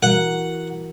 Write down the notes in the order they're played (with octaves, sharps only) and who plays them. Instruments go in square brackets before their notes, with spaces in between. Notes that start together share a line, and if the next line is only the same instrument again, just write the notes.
[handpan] E3 F#4 A#4 [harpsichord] F#5